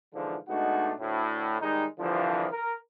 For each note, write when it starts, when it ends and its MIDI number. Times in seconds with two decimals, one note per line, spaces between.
0.14 0.37 44
0.14 0.37 50
0.14 0.37 52
0.14 0.37 53
0.49 0.92 47
0.49 0.92 56
0.49 0.92 57
0.49 0.92 62
0.49 0.92 63
0.49 0.92 66
0.99 1.59 38
0.99 1.59 45
1.61 1.86 51
1.61 1.86 55
1.61 1.86 56
1.61 1.86 63
1.99 2.47 36
1.99 2.47 50
1.99 2.47 52
1.99 2.47 53
2.52 2.74 70